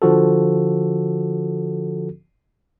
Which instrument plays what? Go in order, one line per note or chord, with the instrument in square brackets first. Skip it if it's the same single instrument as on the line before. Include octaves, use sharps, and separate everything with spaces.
[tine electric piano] D3 F3 F#4 A4